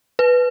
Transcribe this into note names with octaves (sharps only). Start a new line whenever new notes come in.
B4